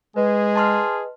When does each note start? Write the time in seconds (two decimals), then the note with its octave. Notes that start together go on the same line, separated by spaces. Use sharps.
0.16 G#3 G#4 B4 D#5
0.56 A5 C6 F6